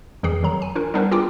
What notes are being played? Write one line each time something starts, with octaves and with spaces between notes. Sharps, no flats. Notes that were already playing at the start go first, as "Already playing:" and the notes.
F2 E3 G#4 C7
D#3 F#3 A#5
G#5
D4 F4 A#4
G3 B3 D4 D#4 A#4 B4
F4 G#4 G5 A#5 D6 D#6